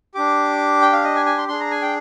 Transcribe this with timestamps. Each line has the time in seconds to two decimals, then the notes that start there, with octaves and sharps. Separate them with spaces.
0.15 D4 G4 D6
0.82 G5
0.93 F5
1.04 D#5
1.16 G#5
1.26 G#5
1.38 C6
1.48 D4 G#4 C6
1.60 A#5
1.71 G#5
1.82 G5